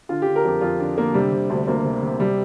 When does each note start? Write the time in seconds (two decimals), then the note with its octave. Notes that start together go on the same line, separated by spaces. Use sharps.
0.09 D3 F4
0.22 D3 G4
0.36 A#4
0.45 F2 G4
0.61 F2 F4
0.79 D3 D4
0.97 D3 A#3
1.14 C3 G3
1.32 C3
1.50 D2
1.67 D2 A#3
1.84 C3
2.02 C3
2.20 C3 G3